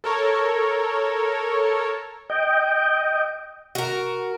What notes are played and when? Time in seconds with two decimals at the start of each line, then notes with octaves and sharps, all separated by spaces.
0.04 A4 A#4 C#5
2.30 D#5 G5
3.75 F#4 A#4